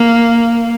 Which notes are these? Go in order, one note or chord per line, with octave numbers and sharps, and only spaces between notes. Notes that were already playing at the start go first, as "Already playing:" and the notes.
Already playing: A#3